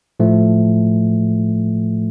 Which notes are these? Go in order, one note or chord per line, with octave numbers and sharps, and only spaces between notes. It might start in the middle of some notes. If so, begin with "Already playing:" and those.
A2 F3 A3